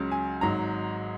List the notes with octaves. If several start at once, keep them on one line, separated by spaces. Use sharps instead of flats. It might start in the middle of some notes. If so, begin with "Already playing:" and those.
Already playing: C#2 C#3 F#3
G#5
G#1 G#2 F#3 A#5